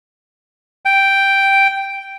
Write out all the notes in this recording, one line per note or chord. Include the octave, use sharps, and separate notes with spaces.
G5